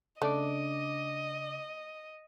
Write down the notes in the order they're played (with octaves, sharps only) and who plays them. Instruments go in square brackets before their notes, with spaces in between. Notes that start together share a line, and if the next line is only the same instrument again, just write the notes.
[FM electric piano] C#3 D4 D6 [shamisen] A3 [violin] D#5